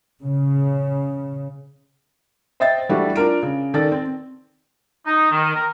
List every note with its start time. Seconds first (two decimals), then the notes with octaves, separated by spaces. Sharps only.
0.25 C#3
2.60 C5 D#5 E5 G5 A6
2.89 E3 G3 A3 D4 E4 F#4
3.16 D4 F4 A#4 D7
3.43 C#3
3.74 D#3 A4 D5 A6
3.92 C4
5.07 D#4
5.31 D#3
5.55 A#4